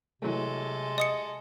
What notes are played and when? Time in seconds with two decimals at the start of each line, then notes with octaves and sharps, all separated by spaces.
0.22 C3 E3 F#3 G#3 A3 A4
0.98 D#5 D#6 C#7